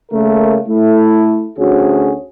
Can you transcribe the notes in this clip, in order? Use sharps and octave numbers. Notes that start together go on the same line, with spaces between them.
C#3 A3 A#3 A#4
A3 E4
D2 C#4 F#4 G#4